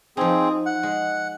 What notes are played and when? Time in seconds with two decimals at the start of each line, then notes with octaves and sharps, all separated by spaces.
0.17 F3 C4 D#4 G#4
0.66 F#5
0.83 G#3